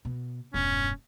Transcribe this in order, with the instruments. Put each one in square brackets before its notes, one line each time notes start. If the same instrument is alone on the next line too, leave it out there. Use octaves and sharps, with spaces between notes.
[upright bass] B2
[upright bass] E1 G2 [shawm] C#4